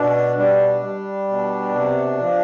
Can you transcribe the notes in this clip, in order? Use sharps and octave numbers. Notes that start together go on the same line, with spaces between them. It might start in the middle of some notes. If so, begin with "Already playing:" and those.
Already playing: B2 D4
G3 D4
G3
B2
C3
F3